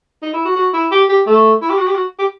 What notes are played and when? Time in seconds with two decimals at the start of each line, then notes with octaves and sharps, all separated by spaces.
0.22 D#4
0.33 E4
0.45 F#4
0.56 F#4
0.73 E4
0.91 G4
1.09 G4
1.27 A3
1.61 E4
1.70 G4
1.78 F#4
1.87 G4
1.95 F#4
2.19 G4